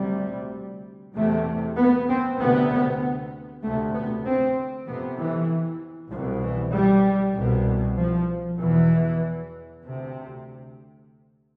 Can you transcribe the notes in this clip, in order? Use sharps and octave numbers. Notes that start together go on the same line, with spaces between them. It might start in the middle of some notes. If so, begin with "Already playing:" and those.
Already playing: D2 C3 G3
E2 C3 A3
B3
C4
D2 C3 B3
D2 C3 A3
B3
C4
F2 C3 B3
E3
C2 F3
B2
E3
G3
C2 B2
F3
E2 B2 E3
D2 C3